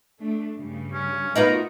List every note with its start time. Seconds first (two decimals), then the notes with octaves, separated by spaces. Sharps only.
0.20 A3 D4
0.56 G2 C#3 G3
0.93 C#4
1.36 A#3 B3 D#4 F4 F#4 A#4 B4